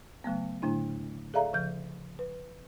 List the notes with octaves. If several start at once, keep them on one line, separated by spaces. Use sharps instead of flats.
C#3 F#3 A3 B3
A2 D3 A3 D4 E4
G#4 A4 D5 E5 F5 A#5
C#3 F3 G6
B4